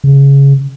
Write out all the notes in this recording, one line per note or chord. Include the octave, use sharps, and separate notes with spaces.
C#3